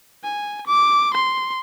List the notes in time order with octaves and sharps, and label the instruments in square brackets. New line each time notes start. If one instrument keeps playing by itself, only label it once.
[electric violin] G#5
D6
C6